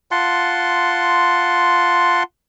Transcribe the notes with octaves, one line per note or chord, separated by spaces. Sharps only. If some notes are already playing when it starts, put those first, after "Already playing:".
F4 F#5 A5 C6